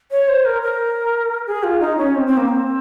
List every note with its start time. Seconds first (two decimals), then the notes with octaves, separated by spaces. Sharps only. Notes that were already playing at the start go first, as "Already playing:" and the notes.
0.11 C#5
0.28 C5
0.45 A#4
0.62 A#4
1.47 G#4
1.63 F4
1.80 D#4
1.98 C#4
2.15 C4
2.27 C4
2.37 A#3
2.49 C4